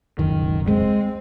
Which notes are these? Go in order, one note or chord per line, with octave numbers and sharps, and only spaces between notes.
E1 C#2 F#2 D#3
G#3 C4